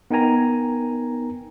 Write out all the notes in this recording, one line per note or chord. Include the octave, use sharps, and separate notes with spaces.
B3 D#4 A#4 G5 G#5 A#5